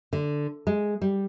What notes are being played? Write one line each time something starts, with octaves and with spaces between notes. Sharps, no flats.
D3
G#3
G3